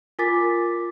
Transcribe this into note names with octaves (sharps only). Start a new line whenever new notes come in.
F4 A#4 G#5 D6 A6 B6